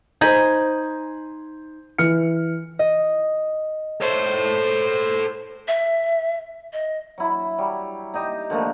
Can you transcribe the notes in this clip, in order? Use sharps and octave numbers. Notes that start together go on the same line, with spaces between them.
D#4 C5 G#5 B5 G6
E3 F6 C#7
D#5
A4 C5 C#5
E5
D#5
F#3 E4
F#3 G3
D#4 G4 D#5
D3 F3 A3 A#3